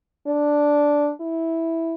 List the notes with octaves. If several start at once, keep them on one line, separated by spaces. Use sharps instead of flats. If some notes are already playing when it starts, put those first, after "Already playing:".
D4
E4